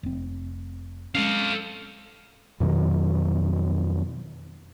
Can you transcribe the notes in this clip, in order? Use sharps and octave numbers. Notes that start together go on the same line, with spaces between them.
F1 C4
G#3 C#4 A4 F5
F2 B2 D#3 F#3